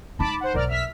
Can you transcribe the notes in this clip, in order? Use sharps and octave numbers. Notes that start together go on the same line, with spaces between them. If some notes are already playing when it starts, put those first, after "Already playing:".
G#3 D#4 A5 B5 D6
C5 F#5
B1 E2 A#4 D5 F6
E5 F6 B6